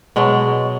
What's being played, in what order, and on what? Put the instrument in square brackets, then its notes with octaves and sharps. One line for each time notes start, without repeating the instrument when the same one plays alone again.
[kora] B2 F#3 G#3